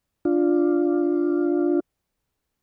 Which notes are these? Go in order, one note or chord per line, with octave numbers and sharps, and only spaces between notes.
D4 F4